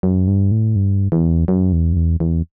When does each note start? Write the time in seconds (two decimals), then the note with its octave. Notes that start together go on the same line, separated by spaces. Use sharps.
0.03 F#2
0.27 G2
0.51 A2
0.76 G2
1.12 E2
1.48 F#2
1.73 E2
1.93 F#2
1.96 E2
2.20 E2